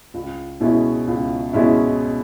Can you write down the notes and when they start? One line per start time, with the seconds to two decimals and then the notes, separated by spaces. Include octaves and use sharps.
0.14 C#2
0.61 B2 G#3 C#4 E4
1.07 C#2
1.53 B2 G#3 C#4 E4